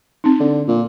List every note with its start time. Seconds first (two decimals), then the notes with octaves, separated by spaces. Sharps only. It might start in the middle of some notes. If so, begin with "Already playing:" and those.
0.24 C4 D#4
0.40 D3
0.68 A#2